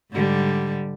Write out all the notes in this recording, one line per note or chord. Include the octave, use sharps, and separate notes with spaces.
G#2 D3 G3